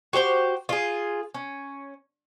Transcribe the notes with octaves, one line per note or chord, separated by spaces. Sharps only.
F#4 G4 C5 G5
F4 G#4
C#4